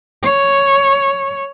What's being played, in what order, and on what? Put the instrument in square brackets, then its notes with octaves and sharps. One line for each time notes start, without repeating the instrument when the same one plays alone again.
[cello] C#5